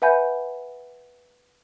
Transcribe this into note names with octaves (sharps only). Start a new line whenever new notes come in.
B4 E5 F#5 G#5 B5 G6